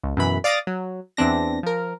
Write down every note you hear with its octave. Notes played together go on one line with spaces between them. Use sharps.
C#2
F#2 B2 E3 B5
D5 F5 D6 D#6 A6 A#6
F#3
E2 E3 C4 D4 A#6
F3 A#4